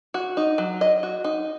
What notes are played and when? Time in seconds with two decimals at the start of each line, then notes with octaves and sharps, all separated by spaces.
0.14 F#4
0.37 D#4
0.58 F#3
0.81 D#5
1.03 F#4
1.24 D#4